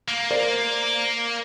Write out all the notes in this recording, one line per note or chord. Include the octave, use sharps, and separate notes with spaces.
A#3
A#4 C5 D5